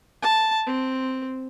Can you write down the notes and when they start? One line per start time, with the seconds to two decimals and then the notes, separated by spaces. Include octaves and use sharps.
0.23 A5
0.67 C4